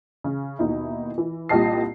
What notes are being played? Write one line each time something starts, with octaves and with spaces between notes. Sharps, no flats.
C#3
D#2 B2 D#4 E4
E3
C2 A#2 G4 D#5 A5 C7